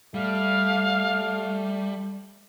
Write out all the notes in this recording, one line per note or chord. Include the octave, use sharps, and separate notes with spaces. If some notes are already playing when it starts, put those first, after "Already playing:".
G3 A3 F5